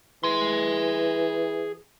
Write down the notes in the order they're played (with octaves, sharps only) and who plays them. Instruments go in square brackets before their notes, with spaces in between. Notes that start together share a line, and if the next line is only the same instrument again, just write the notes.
[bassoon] E3 [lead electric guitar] G#4 C6